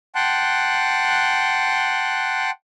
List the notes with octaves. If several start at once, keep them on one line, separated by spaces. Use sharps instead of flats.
F#5 G5 A5 C6 F#6